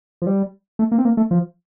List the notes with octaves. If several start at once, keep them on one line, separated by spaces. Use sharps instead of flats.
F3
G3
A3
A#3
C4
A#3
A3
F3